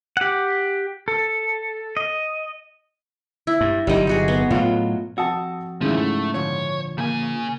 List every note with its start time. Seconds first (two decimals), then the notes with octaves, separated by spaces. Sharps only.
0.17 G4 F#5
1.08 A4
1.97 D#5
3.47 E4
3.61 G2
3.87 G1 C3 F#3 G3 D#4
4.07 D#4 F#4 G#4
4.28 B3
4.51 A2 F#3 F4
5.18 F2 F#4 A5 D#6 E6
5.81 G#2 C#3 F3 A3 E4
5.97 A3
6.34 A#2 D3 F3 C#5
6.98 C#3 A#3 G#5